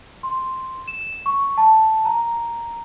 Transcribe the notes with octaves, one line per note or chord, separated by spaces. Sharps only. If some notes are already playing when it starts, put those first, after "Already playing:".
C6
E7
C#6
A5
A#5